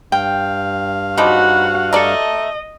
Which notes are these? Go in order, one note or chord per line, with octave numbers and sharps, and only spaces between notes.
G2 F5 G5
C#3 F3 D#4 F#4 B4 F#5 D6
A3 A4 D5 D#5 A#5